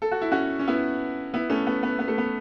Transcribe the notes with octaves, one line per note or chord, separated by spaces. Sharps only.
A4
F#4
E4
C#4 F#4
C#4
B3 E4
B3 E4
A3 C#4
B3
B3
B3
A3
B3